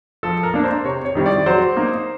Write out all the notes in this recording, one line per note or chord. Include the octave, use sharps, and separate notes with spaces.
F3 A4
A#4
A#3 D4
C5
C3 C#5
C#5
D#3 G3 C4 E4
D5
F#3 C5
A#3 D#4